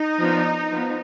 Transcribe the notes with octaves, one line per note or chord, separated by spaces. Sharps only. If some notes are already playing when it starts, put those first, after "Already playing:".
Already playing: D#4
F3 B3 D4
F3 B3